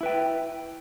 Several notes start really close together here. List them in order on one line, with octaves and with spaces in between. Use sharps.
E4 B4 G5